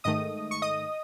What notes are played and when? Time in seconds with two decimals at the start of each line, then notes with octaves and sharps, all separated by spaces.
0.04 G#2 D#3 A3 D#5 D#6
0.51 C#6
0.62 D#5 D#6